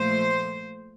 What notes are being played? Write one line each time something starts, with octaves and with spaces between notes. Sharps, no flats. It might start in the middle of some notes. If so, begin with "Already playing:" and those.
Already playing: A#2 F3 A3 C5